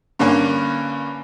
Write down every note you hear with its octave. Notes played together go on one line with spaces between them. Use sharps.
G2 D3 A#3 C#4